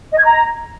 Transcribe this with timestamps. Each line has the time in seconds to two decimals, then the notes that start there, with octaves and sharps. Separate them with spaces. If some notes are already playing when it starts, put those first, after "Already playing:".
0.12 D#5
0.18 G#6
0.24 A#5